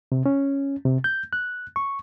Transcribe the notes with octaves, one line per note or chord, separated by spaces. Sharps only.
C3
C#4
C3
G6
F#6
C#6